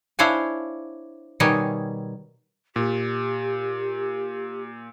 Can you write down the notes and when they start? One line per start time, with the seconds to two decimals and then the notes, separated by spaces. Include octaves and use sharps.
0.19 D4 E4 C5 C#5 F5 G#5
1.40 B2 D#3 G3 D#4 C#5 G#5
2.76 A#2 G4